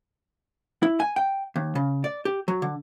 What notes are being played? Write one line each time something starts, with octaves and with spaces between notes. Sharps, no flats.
E4
G#5
G5
D#2
C#3
D5
G4
F#3
D3